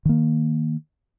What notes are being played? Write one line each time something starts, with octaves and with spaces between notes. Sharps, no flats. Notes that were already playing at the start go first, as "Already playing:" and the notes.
D#3 A#3